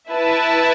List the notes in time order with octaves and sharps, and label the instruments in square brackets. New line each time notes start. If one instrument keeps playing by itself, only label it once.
[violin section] E4 B4 E5 A5